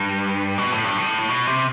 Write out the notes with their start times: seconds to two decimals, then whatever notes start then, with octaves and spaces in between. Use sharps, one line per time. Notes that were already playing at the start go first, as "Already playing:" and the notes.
Already playing: G2
0.58 B2
0.72 A2
0.84 G2
0.97 A2
1.29 B2
1.47 C3